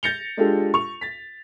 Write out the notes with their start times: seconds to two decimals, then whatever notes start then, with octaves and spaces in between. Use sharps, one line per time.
0.03 G6 A6 A#6 C#7 F7 G7
0.37 G#3 D4 F4 G4 A4
0.74 C#6 F7
1.01 A6 B6